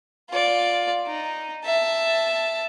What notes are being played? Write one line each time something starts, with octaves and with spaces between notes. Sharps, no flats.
F4 D5
D#4
E5 A5